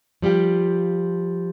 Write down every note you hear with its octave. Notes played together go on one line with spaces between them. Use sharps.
F3 G3 F4 G4